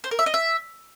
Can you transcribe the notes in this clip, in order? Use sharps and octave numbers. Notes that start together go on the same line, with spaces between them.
C5
A#4
E5
D#5
E5